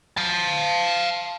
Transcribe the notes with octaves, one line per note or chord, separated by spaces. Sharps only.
F5 A5